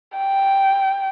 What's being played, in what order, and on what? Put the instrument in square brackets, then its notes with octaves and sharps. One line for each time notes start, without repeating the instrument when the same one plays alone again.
[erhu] G5